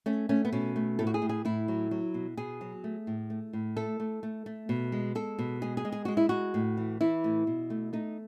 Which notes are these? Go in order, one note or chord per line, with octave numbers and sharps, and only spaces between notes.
A3 C#4
A3 C#4
B3
B2 C#4
A3
A2 A4
F#4
G#4
A2
G#4
A2 E4
F#3
F#3
B2
B2 G#4
F#3
A3
A2
A3
A2
A3 A4
A3
A3
A3
B2
G#3
G#3 A4
B2
G#3 G#4
G#4
G#3
G#4
G#3 F#4
E4
G#3 F#4
A2
E3
E3 E4
A2
B2
A3
A3 D#4